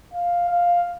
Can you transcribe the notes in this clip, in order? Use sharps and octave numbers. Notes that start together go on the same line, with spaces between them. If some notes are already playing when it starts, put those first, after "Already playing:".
F5
F5